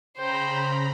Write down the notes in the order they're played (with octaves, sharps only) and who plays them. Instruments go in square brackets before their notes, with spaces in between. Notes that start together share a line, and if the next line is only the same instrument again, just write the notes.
[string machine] C#3 A#5 B5 [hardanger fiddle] C5 G5